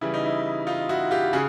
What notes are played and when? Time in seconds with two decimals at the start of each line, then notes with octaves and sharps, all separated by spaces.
0.01 C#3 E3 G3 E4
0.14 D#4
0.26 E4
0.67 D#4 F4
0.89 E4 F#4
1.11 F4 G4
1.33 C#3 F#4 G#4